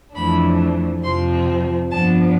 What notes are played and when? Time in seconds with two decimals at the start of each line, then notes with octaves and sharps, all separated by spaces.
0.14 F2 E3 A3 D4 B5
1.02 F2 C3 F3 C4 C6
1.91 G2 F3 B3 D4 A5